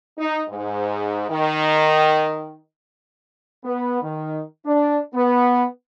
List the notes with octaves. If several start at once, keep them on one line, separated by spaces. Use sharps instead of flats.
D#4
G#2
D#3
B3
D#3
D4
B3